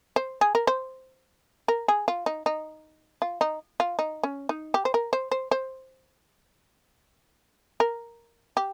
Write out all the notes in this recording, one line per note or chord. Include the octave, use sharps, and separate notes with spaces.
C5
G#4
A#4
C5
A#4
G#4
F4
D#4
D#4
F4
D#4
F4
D#4
C#4
D#4
G4
C5
A#4
C5
C5
C5
A#4
G4